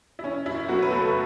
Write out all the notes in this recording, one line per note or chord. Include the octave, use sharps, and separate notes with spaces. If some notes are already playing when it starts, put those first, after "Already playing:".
E4
E3 C#4
F#2 E4
F#3 B3 F#4
B4
F#1 A3 A4